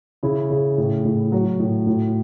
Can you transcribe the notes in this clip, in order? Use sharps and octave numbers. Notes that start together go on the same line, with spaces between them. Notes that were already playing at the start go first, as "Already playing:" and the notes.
C#3 E4
C#3
A2
A2
F#3 F#4
A2
A2